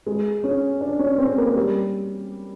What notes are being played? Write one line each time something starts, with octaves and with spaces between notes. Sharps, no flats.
G#3
C#4
D4
C#4
C4
A#3
G3